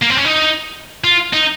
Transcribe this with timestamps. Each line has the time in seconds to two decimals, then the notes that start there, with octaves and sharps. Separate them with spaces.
0.03 A#3
0.11 C4
0.18 C#4
0.26 D#4
1.04 F4
1.33 D#4